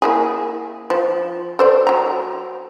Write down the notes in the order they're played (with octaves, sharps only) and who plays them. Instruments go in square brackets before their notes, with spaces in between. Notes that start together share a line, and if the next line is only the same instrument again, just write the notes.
[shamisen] A#3 E4 G#4
F3
A4 C5 D5
F#3 A#5